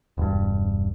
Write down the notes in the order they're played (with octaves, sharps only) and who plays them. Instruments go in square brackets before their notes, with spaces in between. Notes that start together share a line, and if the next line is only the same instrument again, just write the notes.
[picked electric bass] E1 G2